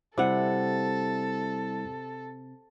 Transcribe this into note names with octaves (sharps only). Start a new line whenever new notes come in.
C3 G3 C4 E4 A4 F#5